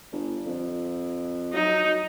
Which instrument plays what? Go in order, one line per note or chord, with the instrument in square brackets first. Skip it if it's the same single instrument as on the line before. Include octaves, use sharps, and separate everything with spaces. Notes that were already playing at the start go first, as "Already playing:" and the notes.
[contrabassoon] G1
F2
[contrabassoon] F#3 [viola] D#4